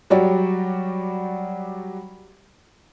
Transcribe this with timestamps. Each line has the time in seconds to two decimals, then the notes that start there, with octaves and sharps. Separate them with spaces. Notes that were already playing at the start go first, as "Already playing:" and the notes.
0.10 F#3 G3 F#4 G4 C#5 D5